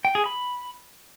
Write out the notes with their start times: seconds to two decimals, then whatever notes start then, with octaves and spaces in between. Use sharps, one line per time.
0.05 G5
0.15 G#4
0.26 B5